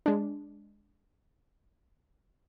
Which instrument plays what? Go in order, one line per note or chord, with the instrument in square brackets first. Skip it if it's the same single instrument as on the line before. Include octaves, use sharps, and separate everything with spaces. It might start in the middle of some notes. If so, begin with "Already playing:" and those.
[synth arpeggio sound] G#3 D4